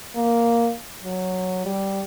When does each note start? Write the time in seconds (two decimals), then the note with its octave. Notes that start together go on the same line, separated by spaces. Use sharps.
0.16 A#3
1.04 F#3
1.66 G3